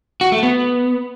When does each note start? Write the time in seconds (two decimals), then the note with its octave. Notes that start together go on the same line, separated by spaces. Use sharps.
0.21 F#4
0.32 A3
0.43 B3